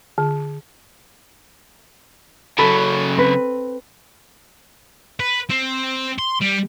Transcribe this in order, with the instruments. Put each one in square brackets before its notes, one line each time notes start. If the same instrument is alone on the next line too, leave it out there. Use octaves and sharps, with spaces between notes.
[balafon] D3
[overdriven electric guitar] C#3 F#3 [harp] A4 B5
[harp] C4 B4
[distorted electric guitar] B4
C4
C6
G3